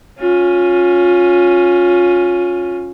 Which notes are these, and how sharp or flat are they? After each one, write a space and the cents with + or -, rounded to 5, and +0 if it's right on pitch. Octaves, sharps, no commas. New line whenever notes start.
C#4 +0 F4 +25